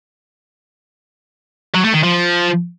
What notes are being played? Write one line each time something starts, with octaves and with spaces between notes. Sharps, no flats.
F#3
A3
D#3
F3